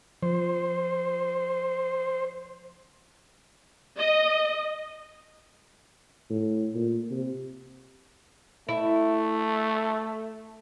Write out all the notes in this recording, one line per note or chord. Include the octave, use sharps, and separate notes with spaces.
F3 C5
D#5
A2
A#2
C3
A3 E4